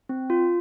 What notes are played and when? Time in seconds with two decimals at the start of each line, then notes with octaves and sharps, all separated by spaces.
0.09 C4
0.30 F4